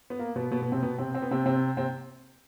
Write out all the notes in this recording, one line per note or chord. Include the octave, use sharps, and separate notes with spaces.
B3
A#3
B2 B3
B2 B3
B2 B3
C3 C4
B2 B3
C3 C4
C4
B3
C3 C4
C3 C4
C3 C4